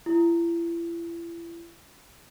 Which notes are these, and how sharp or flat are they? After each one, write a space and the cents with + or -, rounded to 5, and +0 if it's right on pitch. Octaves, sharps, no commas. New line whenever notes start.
E4 +40